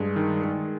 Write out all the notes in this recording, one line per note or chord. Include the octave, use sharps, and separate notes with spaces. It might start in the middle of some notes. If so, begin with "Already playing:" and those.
Already playing: G2 G#3 G#4
D#3
D#3